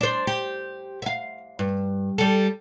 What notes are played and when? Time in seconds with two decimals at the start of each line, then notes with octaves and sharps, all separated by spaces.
0.01 D4 C5
0.27 G4
1.02 E5 F5
1.59 G2
2.18 G3 A4